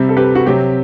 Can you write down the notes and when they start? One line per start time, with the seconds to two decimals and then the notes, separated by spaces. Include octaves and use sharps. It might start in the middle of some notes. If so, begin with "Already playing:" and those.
Already playing: C3 G3 C4
0.09 A4
0.17 G4 B4
0.35 F#4
0.46 C3 F#3 C4 G4